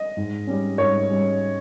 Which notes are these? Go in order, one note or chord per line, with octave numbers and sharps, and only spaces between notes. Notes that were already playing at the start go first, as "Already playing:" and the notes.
Already playing: D#5
G#2
G3 C#4
G#2 C#5
G3 C#4